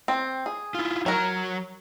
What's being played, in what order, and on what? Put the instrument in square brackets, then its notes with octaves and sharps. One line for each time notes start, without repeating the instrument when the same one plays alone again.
[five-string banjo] C4
G#4
[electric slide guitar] E4 F4
[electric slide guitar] F#3 F#4 [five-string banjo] A#4 C#5